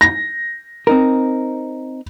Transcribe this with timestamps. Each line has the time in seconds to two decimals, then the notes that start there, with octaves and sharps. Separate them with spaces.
0.01 A#6
0.87 C4 D#4 A#4